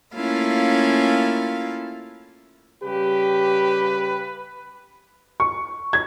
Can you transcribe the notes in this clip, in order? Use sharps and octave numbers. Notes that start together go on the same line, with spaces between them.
A3 A#3 C#4 E4 F4 F5
C#3 G3 G4 B4
C#6
G#6